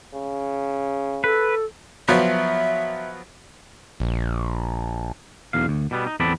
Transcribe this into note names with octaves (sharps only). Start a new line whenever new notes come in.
C#3
A4 B4
F3 F#3 B3 E5
A#1
B1 E2 F5
D2
B2 G3 B3
D#4
E2 B3 C4 A4 D5 B5